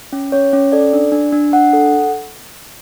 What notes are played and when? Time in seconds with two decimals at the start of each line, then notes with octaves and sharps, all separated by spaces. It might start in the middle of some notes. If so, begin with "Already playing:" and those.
0.13 C#4
0.32 C#4 C#5
0.53 C#4
0.72 A4 D5
0.93 D4
1.12 D4
1.32 D4
1.52 D4 F#5
1.73 A4